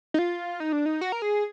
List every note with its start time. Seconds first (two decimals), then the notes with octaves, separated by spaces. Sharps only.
0.14 D#4
0.19 F4
0.60 D#4
0.72 D4
0.86 D#4
1.01 F#4
1.12 A#4
1.22 G#4